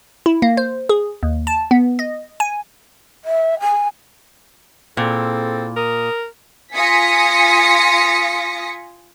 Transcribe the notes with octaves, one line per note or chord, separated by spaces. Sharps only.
E4
A#3
C5
G#4
D#2
A5
B3
D#5
G#5
E5
G#5
A#2 C4 E4 G#4 A4
A#4 D#6
F4 G#5 D#6 A#6 B6 C#7